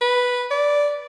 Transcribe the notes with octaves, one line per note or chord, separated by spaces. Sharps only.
B4
D5